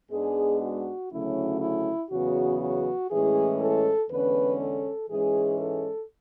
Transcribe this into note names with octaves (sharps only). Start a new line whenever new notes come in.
G#2 G#3 B3 D4 G#4
F#4
D2 C#3 F#3 A3 C#4 E4
E4
E2 C#3 F#3 B3 F#4
F#4
A2 E3 G#3 C#4 G#4
A4
E2 D3 G#3 C#4 B4
A4
G#2 E3 G#3 C#4 G#4
A4